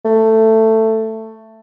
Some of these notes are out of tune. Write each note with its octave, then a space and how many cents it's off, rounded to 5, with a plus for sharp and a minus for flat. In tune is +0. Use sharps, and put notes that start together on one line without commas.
A3 +10